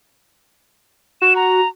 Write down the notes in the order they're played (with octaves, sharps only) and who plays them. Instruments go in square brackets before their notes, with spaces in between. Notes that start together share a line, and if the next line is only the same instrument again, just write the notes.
[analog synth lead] F#4 [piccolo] E7
[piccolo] A#5